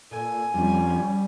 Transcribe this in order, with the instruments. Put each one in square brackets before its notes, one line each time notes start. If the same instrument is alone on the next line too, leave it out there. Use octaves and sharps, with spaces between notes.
[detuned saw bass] A#2 [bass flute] A4 [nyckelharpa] G#5
[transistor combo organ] F2 [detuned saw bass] G3 [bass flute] C#4